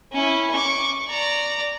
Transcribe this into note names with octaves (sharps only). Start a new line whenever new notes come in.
C#4 E4
C#6 D6
D5 A#5